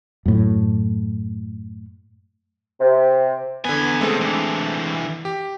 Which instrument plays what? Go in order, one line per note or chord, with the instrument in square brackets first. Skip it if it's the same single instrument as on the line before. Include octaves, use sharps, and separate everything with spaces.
[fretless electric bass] F#2 A2
[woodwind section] C3
[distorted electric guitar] E2 G#5 [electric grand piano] D3 B3
[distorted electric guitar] C#3 D#4 [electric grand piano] G#3 A3 C4
[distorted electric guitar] E3 D4
[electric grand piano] G4